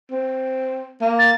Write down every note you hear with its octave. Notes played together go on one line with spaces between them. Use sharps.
C4
A#3
A6